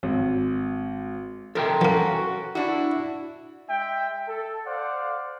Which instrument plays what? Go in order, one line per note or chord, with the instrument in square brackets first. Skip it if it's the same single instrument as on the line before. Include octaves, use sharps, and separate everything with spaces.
[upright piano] G#1
[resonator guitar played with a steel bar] C3 F3 [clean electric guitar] A4 A#4 G5
[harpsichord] E3 A#3 [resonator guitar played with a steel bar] C#4 [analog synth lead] F#4
[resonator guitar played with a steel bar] D4 F#4 [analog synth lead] E4
[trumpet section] G#3 E5 G5
A4
C5 D5 F5 F#5